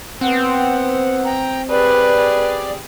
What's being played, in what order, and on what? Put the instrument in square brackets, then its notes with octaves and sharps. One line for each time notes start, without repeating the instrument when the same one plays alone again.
[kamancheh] B3 F#5 [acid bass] C4
[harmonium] G5 A#5
[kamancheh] G4 G#4 [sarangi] B4 [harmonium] D5